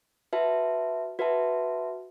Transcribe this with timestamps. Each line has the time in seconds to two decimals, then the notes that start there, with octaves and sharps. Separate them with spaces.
0.33 F#4 B4 E5 A5
1.19 F#4 B4 E5 A5